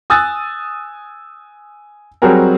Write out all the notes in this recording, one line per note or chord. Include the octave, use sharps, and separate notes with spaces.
G#5 D#6 E6 F#6 A6
F#3 G3 C4 F#4 G#4 A#4